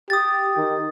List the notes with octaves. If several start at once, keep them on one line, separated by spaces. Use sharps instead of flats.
G4 D#6 A6
D#3